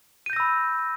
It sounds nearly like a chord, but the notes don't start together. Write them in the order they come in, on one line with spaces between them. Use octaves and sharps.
D#7 G6 A#6 E6 B5